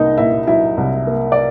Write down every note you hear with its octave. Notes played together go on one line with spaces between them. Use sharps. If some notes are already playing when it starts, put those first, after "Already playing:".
Already playing: C2 A#3 D#4 D#5
A#2 E4 E5
F#3 E4 E5
C2
A#3
D5